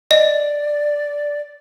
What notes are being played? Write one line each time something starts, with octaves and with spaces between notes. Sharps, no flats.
D5 D#5